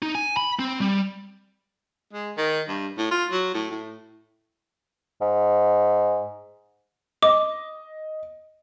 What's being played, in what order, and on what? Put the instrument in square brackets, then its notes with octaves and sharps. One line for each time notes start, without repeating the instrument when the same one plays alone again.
[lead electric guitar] D#4
G#5
B5
C4
G3
[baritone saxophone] G#3
D#3
G2
A2
F4
F#3
A2
A2
[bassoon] G#2
[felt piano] D#5 [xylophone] D6